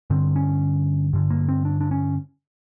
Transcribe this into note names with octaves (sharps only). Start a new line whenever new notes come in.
G2 D3 C4
C#4
G2 D3
A#3
C4
D4
D4
C#4